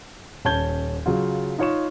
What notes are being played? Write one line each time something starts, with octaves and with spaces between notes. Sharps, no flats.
D#1 C#4 A5 G6 G#6 G7
C#3 F#3 F4
D#4 F4 C#5 C#6 E7